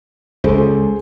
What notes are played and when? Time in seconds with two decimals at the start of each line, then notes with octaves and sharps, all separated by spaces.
0.44 C#2 G#4 A4 C5